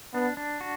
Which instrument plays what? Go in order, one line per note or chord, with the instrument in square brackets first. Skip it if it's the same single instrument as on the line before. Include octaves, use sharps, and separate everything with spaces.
[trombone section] B3 [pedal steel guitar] D4
[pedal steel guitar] D4
F#4